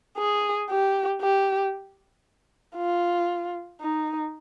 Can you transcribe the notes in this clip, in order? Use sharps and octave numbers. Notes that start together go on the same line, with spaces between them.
G#4
G4
G4
F4
D#4